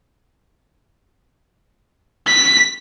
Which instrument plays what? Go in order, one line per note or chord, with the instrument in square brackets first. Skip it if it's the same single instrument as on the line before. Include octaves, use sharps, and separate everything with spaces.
[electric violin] B6